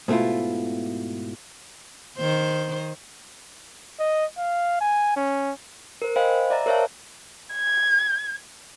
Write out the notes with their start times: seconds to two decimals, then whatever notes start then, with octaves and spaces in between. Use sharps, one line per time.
0.08 G#2 B2 A3 E4 F4
2.18 D#3 C5
3.99 D#5
4.38 F5
4.81 G#5
5.16 C#4
6.02 A#4 C5
6.16 C5 D#5 F5 G5 G#5 B5
6.50 D5 E5 A#5 A6
6.66 A#4 C5 C#5 E5 F5 A5
7.54 G#6